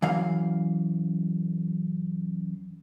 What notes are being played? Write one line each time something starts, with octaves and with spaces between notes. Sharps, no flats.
F#2 E3 F5